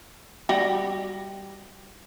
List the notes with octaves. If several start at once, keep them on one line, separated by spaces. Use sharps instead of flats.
G3 F#4 G4